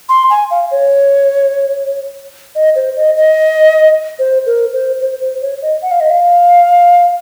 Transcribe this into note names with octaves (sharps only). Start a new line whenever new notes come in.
C6
G#5
F5
C#5
D#5
C5
D#5
D#5
C5
A#4
C5
C5
C5
C#5
D#5
F#5
F5
D#5
F5